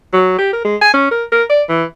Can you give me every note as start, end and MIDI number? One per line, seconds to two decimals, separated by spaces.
0.13 0.35 54
0.38 0.51 67
0.52 0.61 70
0.64 0.76 56
0.81 0.92 80
0.94 1.11 61
1.11 1.24 70
1.32 1.43 70
1.50 1.62 74
1.69 1.84 52